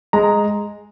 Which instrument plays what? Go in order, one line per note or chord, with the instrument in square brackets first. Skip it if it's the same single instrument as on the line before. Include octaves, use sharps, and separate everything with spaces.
[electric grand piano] G#3 A#5